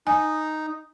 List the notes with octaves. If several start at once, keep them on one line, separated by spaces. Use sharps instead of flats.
D#4 G#5